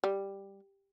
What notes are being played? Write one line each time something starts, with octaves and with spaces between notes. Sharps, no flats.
G3